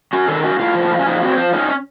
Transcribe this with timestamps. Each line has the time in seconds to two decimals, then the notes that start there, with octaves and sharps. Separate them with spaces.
0.13 C#4 F#4
0.28 D#3 A4
0.44 C#4 F#4
0.59 A2 F4
0.75 F3
0.91 A2
0.99 C#4
1.06 F3 D#4
1.22 C4 F#4
1.33 C#5
1.37 F3 C5
1.53 C#4 D#4
1.69 C#4